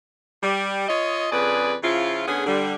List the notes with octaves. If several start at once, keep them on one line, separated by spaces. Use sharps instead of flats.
G3
F4 C#5 D#5
F2 C#3 G#4 B4 D5
C#3 F3 E4 F4
D3 B3 C#4 G#4
D3 G3